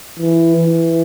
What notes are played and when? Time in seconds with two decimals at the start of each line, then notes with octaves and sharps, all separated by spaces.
0.20 E3
0.56 E3